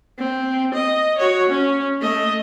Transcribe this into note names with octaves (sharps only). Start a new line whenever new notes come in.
C4
D#5
F#4 C#5
C#4
A3 D#5